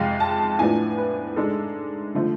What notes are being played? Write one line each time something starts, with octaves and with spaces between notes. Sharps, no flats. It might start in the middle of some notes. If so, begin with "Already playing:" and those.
Already playing: F2 C3 G#3 F5
A5
A2 F3 B3 D4 G#5
B4
G#2 G#3 D4 A4
D3 F3 A3